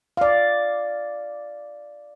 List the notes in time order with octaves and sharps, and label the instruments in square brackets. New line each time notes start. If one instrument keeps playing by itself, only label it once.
[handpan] D5 F5